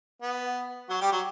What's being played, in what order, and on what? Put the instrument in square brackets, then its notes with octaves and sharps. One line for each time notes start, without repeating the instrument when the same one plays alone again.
[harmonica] B3
F#3 F#4
G3 G4
F#3 F#4